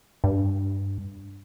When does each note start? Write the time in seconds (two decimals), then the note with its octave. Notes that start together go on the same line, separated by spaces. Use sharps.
0.24 G2